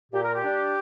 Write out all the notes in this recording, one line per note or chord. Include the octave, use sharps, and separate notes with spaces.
A#2 G4
A#4
G4
G3 D4